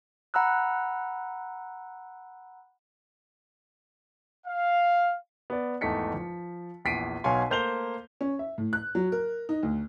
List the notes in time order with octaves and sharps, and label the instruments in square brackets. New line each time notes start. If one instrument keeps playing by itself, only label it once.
[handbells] F#5 A#5 B5 E6 F#6
[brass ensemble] F5
[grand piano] B3 D5
G#1 E2 A3 D#4 B6 C#7
F3
A#1 E2 B6 C7 D7 D#7
B1 B2 C#5 F5 G#5 C6
A3 A#3 C5 G6 F7 G7
C#4
E5
A2
F#6
F#3
A#4
D#4
D2